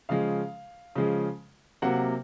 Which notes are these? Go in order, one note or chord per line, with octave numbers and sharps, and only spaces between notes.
C#3 F3 G#3 F5
C#3 F3 G#3
C3 F#3 A#3 F#5